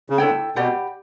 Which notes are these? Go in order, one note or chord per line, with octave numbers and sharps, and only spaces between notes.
C#3
D3 E4 A4 C#5 G5
B2 G4 D5 F#5 B5